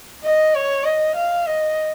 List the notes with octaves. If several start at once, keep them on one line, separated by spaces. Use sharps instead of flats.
D#5
C#5
D#5
F5
D#5